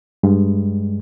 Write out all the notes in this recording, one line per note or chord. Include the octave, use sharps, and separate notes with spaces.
G2 G#3